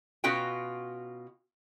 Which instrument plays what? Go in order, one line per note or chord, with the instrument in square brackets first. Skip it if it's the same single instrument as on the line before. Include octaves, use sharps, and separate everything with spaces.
[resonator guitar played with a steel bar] B2 C#4 F4 F#4 G5